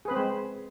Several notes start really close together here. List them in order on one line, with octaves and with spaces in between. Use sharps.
G#4 B4 C4 C5 G#3